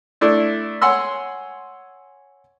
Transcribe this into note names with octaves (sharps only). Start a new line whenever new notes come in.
A3 D4 E4
C#5 F#5 G#5 C6 E6